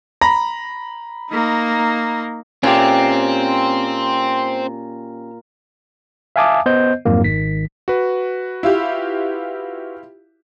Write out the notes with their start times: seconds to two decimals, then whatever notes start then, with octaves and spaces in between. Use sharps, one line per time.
0.21 A#5 B5 A#6
1.31 A#3 D#4
2.63 A#2 C4 C#4 G4
6.36 E5 F5 G#5 A5 D6 D#6
6.66 B3 C5 D#5 G6
7.05 F2 G#2 F#3 A#3
7.24 G#1 D#3 B6
7.88 F#4 B4
8.63 E4 F4 G4